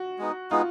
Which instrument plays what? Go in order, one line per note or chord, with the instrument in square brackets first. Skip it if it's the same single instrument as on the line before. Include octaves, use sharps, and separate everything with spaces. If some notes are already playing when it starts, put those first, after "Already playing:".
Already playing: [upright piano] F#4
[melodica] G#3 B3 D#4
[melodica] G#3 B3 D#4 [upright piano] F4